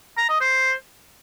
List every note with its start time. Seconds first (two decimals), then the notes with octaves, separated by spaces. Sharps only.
0.18 A#5
0.29 D#5
0.41 C5